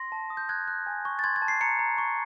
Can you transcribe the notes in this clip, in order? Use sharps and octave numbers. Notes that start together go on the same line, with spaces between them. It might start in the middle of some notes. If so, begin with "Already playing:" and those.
Already playing: C6 A#6
A5
D#6
G6
F#6 G#6
F#6
G#5
C#6
A6
C6 G#6
G#6
A5
C7
A#5 C#7
A#5
C#6